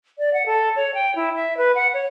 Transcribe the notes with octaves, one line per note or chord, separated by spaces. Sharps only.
D5
F#5
A4
C#5
G5
E4
E5
B4
F#5
C#5